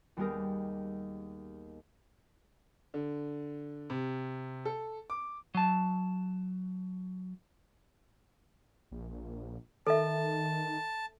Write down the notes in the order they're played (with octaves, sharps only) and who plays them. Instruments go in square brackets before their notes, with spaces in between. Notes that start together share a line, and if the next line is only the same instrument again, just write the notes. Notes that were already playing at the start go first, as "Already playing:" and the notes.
[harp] D#2 G3 B3 G4 G#4 A#4
[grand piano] D3
C3
A4
D6
[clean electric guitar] F#3 A5
[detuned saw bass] A#1
[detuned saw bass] D#3 [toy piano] A4 E5 [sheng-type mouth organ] A5